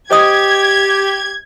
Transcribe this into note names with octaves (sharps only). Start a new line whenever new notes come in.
G4 C5 D#5 D#6 G#6